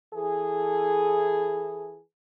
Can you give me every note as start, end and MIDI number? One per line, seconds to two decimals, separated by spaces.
0.14 1.99 52
0.14 1.99 68
0.14 1.99 69